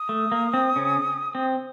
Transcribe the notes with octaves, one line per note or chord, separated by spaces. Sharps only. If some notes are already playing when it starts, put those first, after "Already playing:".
Already playing: D#6
A3
A#3
C4
C#3 C#4
C4